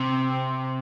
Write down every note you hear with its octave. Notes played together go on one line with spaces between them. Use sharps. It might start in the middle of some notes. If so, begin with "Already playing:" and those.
Already playing: C3 C4
C4